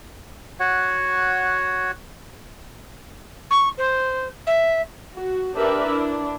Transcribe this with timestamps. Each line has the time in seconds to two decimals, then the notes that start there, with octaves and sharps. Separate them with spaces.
0.60 F#4 C#5 F#5
3.50 C#6
3.77 C5
4.47 E5
5.16 F#4
5.54 D4 G4 A#4 B4 D5 E5
5.86 D4 E4